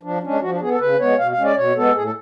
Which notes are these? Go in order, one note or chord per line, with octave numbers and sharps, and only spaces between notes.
F3 D4
G#3 C#4 D4
F3 F#4
D4
B3 G#4
A4
C#3 B4
G#3 B3 C#5
B2 F5
F5
G#3 C#4
D5
B2 C#5
G#3 B3 A4
A2 G#4
A4